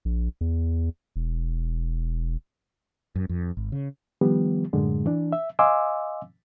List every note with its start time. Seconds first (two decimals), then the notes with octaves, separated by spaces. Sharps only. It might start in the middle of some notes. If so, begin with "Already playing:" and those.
0.05 A#1
0.41 E2
1.16 E1
3.15 F#2
3.29 F2
3.57 G#1
3.72 C#3
4.21 D#3 F3 G3 B3 G4
4.73 F#2 A2 D3 G#3
5.06 E3 D4
5.32 E5
5.59 D#5 F5 G#5 C6 D6 E6